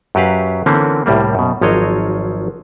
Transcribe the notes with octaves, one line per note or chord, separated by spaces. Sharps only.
F#2 F#3 G4 B4 F5
D3 E3 A#3 C4 C#4
C2 A2 G3 A#3
F#2 B2
G#1 F3 F#3 C#5 D#5 F5